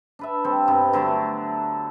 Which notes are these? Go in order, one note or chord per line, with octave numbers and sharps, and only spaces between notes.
D4 B4 E5
G3 C4 A4
G2 C3 B3
D3 F#3 A3 D4